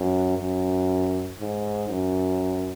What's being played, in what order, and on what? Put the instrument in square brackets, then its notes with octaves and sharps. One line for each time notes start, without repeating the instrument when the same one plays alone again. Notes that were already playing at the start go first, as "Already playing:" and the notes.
Already playing: [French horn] F#2
F#2
G#2
F#2